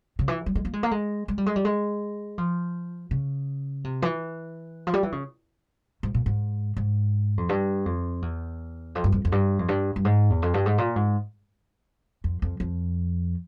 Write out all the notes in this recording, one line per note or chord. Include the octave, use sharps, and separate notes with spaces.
C#3
E3
G3
G#3
A#3
G#3
A#3
G#3
G#3
G3
G#3
G3
G#3
F3
C#3
C3
E3
F3
G3
E3
C#3
G#2
A#2
G#2
G#2
F2
G2
F2
E2
F2
G2
F2
F2
G2
F2
G2
G2
G#2
E2
F2
G2
G#2
A#2
G#2
F2
F2
F2